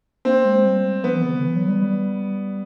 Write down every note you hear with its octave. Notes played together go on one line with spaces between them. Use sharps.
A#3 C4
G#3
G3
F3 B3
E3
C#3
D3
E3
F#3
G3
G3